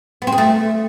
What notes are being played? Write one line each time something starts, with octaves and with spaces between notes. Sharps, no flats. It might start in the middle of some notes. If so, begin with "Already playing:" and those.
B3
C4
G#4
A3